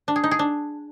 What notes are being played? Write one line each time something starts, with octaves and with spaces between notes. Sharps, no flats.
D4
G#4
D#4
G#4
D4